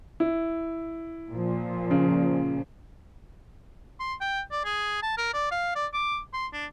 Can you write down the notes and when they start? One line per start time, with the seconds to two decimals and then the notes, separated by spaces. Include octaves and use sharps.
0.20 E4
1.31 A#2 F3
1.91 C#3
4.00 C6
4.21 G5
4.51 D5
4.64 G#4
5.02 A5
5.17 A#4
5.33 D5
5.51 F5
5.75 D5
5.93 D6
6.33 C6
6.53 D4